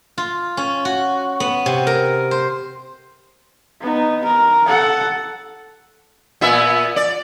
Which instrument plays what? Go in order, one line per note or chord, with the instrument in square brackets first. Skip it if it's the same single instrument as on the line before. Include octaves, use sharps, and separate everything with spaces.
[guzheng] F4
C#4
F#4
B3
C3
A#4
C5
[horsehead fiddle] B3 D#4
A#4
A4 F#5
[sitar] A#2 B3 E5
D5